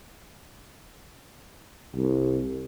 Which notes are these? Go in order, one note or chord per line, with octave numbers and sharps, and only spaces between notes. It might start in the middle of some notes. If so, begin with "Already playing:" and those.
C2